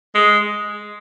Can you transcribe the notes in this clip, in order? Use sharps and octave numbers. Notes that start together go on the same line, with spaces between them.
G#3